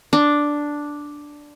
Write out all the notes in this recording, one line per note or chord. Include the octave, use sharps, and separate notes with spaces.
D4